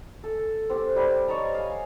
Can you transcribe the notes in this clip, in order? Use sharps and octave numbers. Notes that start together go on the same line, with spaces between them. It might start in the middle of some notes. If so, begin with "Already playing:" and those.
A4
C4 G4
G3
C#5 D#5 A5 A#5
F5 G#5